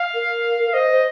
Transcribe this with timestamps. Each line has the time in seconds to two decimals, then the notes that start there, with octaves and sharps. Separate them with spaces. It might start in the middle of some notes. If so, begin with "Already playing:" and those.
Already playing: F5
0.15 A#4
0.73 C5 D#5
0.91 C5